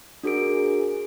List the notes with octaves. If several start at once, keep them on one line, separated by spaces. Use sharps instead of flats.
D4 F#4 G#4 A#4 D7